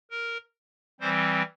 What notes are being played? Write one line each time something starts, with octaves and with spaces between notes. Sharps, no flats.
A#4
E3 G3 C4 C5